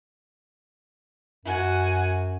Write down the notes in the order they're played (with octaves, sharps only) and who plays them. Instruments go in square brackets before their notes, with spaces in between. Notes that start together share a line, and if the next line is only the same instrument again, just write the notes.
[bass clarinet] F#2 [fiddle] F#4 G#5